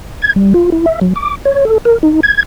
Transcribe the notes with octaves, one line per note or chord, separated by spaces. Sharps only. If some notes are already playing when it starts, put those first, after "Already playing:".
G#6
G3
F4
E4
E5
F#3
D6
C#5
A4
A#4
D#4
G#6